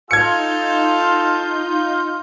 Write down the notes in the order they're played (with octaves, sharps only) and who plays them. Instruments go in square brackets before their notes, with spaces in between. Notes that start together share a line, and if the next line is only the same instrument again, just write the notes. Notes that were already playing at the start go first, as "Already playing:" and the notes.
[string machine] D#4 G6 [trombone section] F4 [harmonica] A4 A5 F6 [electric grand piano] G#6 C#7